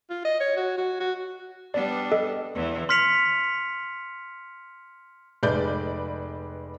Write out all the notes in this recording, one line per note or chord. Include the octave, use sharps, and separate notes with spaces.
F4
D#5
C#5
F#4
F#4
F#4
G3 B3 D4 D5
A4 D#5
E2 E3
C6 F6 B6 C#7 F7
F1 G#3 B4 D5 G6